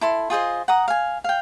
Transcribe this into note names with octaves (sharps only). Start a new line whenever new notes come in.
E4 A4 C6
F4 G#4 C5 D#5
F#5 A#5 D#6
F5 G#5
F5 G5